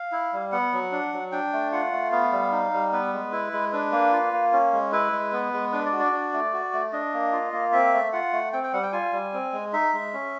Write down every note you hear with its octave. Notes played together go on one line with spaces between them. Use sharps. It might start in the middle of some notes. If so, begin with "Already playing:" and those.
Already playing: F5
E4
G3
B3 F#5
F#3
D4
F#3
D4 G5
A3
F4 F#5
A3
B3 F5
G3
D#4
G3
B3 B4
G#3
E4
G#3
D4 B4
A#3
F4
A#3
C#4
G#3
E4 B4
G#3
B3
G#3
D4 B4
D5
F#4
D5
D4
A3
F#4
A3
D4 D#5
A#3
F4
A#3
C4 E5
A3
F4 F#5
A3
C4 G5
G5
G3 F#5
G5
F4 G#5
G3
C4
G#3
D#4 E5
G#3
C#4